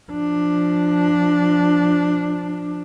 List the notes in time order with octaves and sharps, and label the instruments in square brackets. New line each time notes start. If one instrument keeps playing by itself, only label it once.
[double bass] F3 D4